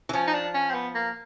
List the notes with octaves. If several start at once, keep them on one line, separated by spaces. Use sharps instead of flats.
E3
F3 C#4
D#4
D4
C#4
C4
B3
A#3